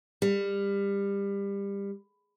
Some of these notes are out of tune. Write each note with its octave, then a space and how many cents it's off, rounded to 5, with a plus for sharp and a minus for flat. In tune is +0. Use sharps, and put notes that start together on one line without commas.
G3 +25